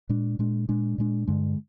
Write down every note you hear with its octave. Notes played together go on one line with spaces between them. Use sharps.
A#2 G#3 D4
A#2 G#3 D4
A#2 G#3 D4
A#2 G#3 D4
G2 D3 G#3